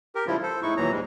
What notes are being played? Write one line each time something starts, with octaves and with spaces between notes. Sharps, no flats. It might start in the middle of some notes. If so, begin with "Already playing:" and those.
G4 A#4
G#2 C#3 F3 G3 E4 F4
A4 C5
A2 G#3 D#4 E4 C#6
D#2 A#2 E3 F#3 A#5
G#2 G3 G#3